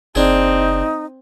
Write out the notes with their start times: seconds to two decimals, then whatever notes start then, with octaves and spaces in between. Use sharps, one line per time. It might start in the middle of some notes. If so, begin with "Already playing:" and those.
0.15 F#1 C4 D4 D#4 G#4